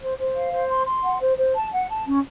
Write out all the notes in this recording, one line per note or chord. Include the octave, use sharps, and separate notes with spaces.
C5
C5
F5
C5
C6
C6
F#5
C5
C5
A5
F#5
A5
C#4